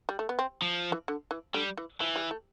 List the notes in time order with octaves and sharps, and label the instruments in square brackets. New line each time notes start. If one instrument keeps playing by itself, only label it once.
[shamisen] G3
A3
B3
C4
[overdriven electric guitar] F3
[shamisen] E3
D3
E3
[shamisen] D3 [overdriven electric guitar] G3
[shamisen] E3
[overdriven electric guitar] E3 [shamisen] F3
[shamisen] G3
A3